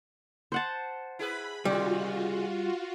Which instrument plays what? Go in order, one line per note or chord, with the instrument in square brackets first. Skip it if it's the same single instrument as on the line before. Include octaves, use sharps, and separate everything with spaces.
[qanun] C5 F#5 A5
[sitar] E4 G#4 B4 [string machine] B5
[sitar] C3 D#3 G#3 [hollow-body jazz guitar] G3 [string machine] F4 F#4